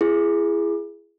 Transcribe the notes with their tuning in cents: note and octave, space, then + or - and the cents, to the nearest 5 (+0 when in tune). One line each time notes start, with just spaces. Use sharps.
E4 +35 G#4 +0